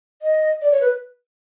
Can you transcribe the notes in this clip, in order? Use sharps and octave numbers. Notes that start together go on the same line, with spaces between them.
D#5
D5
C#5
B4